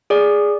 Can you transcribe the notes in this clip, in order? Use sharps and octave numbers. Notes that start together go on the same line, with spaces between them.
G#4 D5